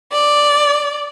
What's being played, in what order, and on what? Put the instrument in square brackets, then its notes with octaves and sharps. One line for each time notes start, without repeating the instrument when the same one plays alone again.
[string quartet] D5